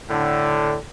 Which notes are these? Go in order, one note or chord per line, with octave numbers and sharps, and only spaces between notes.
A2 D3